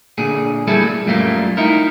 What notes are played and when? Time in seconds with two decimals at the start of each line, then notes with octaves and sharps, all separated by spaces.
0.18 A#2 D3 G#4
0.67 G3 A#3 E4 G#4 A4
0.83 A#2
1.07 F#2 G3 A3 A#3 F4
1.57 D#4 E4 A#4